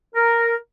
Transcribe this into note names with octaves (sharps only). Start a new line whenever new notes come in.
A#4